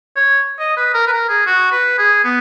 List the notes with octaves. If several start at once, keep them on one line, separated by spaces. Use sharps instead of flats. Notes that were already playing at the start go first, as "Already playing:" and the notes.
C#5
D#5
B4
A#4
B4
A#4
G#4
F#4
B4
G#4
B3